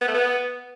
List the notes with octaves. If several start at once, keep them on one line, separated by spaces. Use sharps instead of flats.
B3
A3
B3